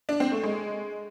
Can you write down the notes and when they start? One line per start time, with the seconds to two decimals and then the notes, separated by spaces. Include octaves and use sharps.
0.09 D4
0.20 C4
0.32 A3
0.43 G#3